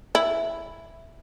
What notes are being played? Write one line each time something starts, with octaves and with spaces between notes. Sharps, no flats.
E4